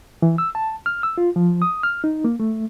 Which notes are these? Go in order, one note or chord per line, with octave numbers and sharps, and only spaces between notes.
E3
E6
A5
F6
E6
F4
F3
D#6
F6
D#4
A#3
A3